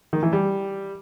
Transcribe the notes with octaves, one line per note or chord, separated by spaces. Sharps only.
D#3
E3
G3